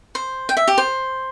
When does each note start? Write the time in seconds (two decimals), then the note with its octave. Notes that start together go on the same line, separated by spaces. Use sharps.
0.15 C5
0.49 G5
0.57 E5
0.68 G4
0.78 C5